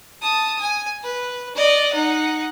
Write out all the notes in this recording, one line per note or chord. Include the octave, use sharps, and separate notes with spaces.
A5 D#6
G#5
B4
D5 D#5
D#4 F#5